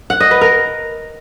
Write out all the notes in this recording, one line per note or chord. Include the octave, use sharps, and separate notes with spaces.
F#5
D#5
B4
A#4